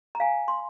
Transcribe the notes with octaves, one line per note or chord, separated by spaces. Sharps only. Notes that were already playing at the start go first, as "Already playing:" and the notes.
A#5
F5 G#5
C6